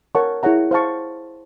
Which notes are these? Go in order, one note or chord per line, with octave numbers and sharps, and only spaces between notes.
A#4 C#5 F#5 A5 C#6
E4 G#4 C#5 F#5 A#5
C5 F5 A5 C#6